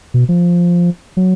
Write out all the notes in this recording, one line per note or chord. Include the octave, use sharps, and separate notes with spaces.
B2
F3
F#3